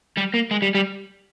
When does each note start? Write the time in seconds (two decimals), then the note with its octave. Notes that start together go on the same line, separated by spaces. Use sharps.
0.17 G3
0.34 A#3
0.51 G#3
0.62 G3
0.75 G3